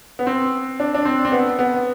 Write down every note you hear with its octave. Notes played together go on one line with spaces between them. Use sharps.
B3
C4
D4
D4
C4
C4
B3
B3